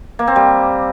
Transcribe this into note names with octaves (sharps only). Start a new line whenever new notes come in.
A#3
C4
G3